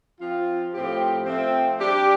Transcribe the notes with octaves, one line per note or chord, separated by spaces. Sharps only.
F3 C4 F4
A2 F3 C4 G4
F3 A3 C4
G3 D4 G4